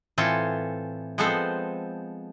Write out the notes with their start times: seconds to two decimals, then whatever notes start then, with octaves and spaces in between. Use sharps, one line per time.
0.18 A2 E3 C4 F4 A4 G#5
1.18 F3 G#3 B3 C4 A4 C5